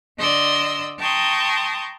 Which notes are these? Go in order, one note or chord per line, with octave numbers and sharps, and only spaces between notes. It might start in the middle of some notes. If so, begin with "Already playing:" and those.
D3 D5 D#5 C6 E6
G5 A5 A#5 C6 C#6 D#6